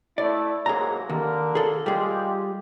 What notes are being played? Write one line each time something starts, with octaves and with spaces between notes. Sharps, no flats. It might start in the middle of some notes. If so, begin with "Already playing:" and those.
A3 E4 D5
G#2 F#3 A#3 G#4 A#5
D#2 D3 A#3 A#4
G#4 A4
G3 G#3 F4 G4 G#4